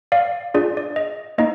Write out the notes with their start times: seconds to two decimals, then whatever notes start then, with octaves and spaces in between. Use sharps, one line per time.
0.12 D5 F5
0.54 D4 F4 G#4 D5
0.77 D5
0.96 D#5
1.38 A#3 D#4 D#5